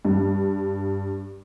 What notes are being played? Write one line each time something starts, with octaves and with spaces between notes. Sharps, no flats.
G2